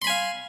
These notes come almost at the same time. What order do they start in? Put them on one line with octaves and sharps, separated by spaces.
C6 B5 G#5 F5